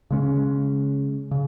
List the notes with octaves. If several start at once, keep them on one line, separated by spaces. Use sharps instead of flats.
C#3 G#3 C#4
C#3